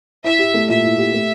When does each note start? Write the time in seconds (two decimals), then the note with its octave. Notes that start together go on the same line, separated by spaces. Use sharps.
0.24 E4 E5
0.39 G4
0.54 A3
0.69 A#2 E5
0.84 E4
0.98 G4
1.14 A3